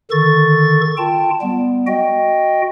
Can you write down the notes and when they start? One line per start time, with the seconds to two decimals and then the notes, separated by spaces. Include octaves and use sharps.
0.11 D3 D#3 A4 C#6 A6
0.97 F4 G5 A5
1.41 G3 B3
1.87 F#4 D#5 G5